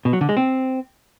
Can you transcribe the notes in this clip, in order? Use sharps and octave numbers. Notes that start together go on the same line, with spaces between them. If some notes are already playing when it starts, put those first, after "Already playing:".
B2
F#3
D3
G#3
C4